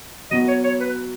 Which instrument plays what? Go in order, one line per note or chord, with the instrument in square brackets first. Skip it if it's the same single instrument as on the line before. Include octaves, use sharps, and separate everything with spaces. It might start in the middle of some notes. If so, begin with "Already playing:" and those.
[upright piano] F#3 B3 F#4 [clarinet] D#5
[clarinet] C#5
C#5
B4